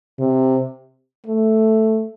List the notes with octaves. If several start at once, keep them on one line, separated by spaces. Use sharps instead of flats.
C3
A3